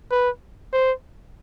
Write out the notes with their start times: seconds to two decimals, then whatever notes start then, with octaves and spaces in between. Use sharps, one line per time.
0.11 B4
0.73 C5